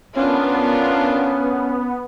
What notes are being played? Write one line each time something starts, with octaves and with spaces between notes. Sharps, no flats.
B3 C#4 D4 F4 A#4